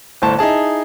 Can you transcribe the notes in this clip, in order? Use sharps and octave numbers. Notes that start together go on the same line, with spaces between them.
G1 A2 C5 A5
D#4 E4 G#4 A5